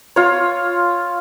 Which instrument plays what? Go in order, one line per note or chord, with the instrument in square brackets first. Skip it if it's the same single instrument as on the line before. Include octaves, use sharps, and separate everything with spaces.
[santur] F4 C#5